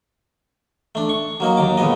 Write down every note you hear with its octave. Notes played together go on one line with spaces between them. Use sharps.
A3 D4
C#6
F#3 A#3 D#4
D#2 D#3 D6
C#2 A#2 B3 D#5